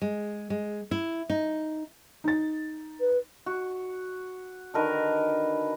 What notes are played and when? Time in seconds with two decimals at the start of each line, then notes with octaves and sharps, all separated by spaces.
0.02 G#3
0.50 G#3
0.91 E4
1.30 D#4
2.24 D#4 A6
3.00 B4
3.46 F#4
4.74 D3 D#3 A#4 B4